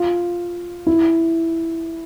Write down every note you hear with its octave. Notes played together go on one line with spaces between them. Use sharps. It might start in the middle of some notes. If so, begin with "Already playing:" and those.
Already playing: F4
E4